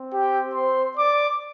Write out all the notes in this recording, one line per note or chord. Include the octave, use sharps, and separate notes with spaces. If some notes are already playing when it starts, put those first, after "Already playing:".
Already playing: C4
G4 G5
C5 C6
D5 D6